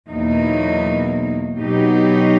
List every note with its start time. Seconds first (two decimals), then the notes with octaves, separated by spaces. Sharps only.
0.10 E2 B2 F#3 A#3 D#4
1.59 B2 F#3 B3 D#4 G4